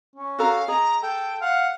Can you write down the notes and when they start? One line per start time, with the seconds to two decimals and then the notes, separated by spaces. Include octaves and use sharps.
0.16 C#4
0.39 F#4 A4 F5 A#5
0.68 G#4 D#5 A#5
1.02 A4 G5
1.41 F5 F#5